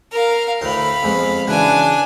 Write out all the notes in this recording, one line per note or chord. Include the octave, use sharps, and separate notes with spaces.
A#4 F5
D2 A2 F5 B5 C6
F2 G#3 B3
C#3 E3 D4 F#4 G#5